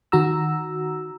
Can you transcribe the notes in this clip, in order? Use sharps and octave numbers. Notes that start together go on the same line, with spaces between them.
D#3 F#4 A#5 E6